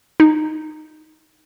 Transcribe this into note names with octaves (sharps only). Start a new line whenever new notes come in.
D#4